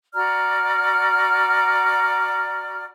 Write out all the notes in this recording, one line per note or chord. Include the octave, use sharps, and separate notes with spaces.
F#4 D5 A#5 F6